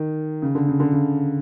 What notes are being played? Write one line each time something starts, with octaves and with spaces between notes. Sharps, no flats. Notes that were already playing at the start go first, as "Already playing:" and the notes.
Already playing: D#3
C#3
D3
C#3
D3
C#3